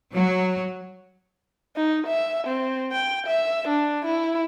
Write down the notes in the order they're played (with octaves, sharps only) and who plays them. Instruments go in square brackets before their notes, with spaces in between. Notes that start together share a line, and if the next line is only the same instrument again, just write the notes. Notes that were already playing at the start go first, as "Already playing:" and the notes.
[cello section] F#3
[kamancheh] D#4
E5
C4
G5
E5
D4
E4